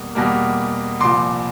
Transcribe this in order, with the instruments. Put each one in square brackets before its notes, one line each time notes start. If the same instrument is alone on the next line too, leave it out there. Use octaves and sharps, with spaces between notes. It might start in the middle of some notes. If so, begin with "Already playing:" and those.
Already playing: [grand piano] E2 B2 G3 A#3
E2 B2 G3 A#3
C2 A#2 F3 C6 D6